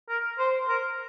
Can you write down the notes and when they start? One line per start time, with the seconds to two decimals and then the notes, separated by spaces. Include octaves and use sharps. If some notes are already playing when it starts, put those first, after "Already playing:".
0.09 A#4
0.39 C5
0.68 A#4